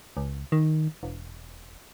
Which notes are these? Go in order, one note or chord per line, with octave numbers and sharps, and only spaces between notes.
C#2
D#3
E1